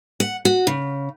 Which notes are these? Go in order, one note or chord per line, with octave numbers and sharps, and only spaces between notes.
F#5
F#4
C#3